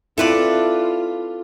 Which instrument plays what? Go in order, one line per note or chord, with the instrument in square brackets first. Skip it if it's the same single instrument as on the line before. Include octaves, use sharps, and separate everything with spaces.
[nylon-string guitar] C4 E4 [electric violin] F4 [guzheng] A4 B4 D5